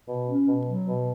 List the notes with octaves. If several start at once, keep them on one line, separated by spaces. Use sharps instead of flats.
B2
C#4
B2
F#3
B2